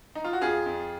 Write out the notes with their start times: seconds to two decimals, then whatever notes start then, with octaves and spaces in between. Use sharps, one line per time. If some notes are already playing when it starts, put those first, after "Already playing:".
0.15 D#4
0.24 F4
0.33 F#4
0.41 F2 F4 G#4
0.66 F2